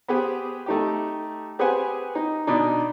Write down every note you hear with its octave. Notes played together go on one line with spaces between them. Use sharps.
B3 G4 G#4 C5
A3 D#4 G4
G4 G#4 B4 C5 F#5 G#5
D#4
B2 D4 D#4